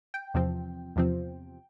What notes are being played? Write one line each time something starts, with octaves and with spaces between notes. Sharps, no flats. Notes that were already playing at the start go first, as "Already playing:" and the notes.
G5
E2 C3 F3 C4
E2 C3 F3 C4